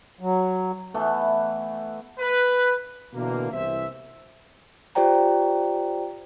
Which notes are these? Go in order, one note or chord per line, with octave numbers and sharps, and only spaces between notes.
F#3
E3 A3 B3
B4
B2 D3 E3 A#3
C2 E3 C5 E5
F4 G4 C5 D5 G5 A#5